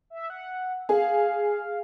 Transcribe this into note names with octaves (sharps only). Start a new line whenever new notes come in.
E5
F#5
G#4 F5